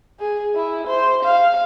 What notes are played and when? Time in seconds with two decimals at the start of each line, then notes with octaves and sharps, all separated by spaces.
0.20 G#4
0.55 E4
0.87 C5
1.23 F5